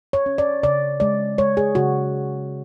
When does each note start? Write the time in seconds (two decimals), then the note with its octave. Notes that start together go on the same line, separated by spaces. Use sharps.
0.13 C#5
0.26 C#4
0.38 D5
0.63 C#3 D5
1.00 G#3 D5
1.38 G#3 C#5
1.57 G#4
1.75 C#3 F#4